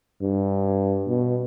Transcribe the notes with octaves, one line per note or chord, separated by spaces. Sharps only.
G2
B2